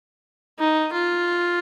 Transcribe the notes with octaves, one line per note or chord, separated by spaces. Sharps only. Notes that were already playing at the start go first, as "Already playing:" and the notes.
D#4
F4